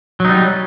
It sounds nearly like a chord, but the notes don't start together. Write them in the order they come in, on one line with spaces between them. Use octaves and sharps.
F#3 D#4 G3